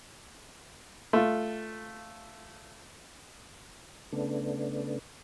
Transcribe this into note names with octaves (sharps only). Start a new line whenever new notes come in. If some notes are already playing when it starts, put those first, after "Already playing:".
A3 F4
C#3 A3 B3 D4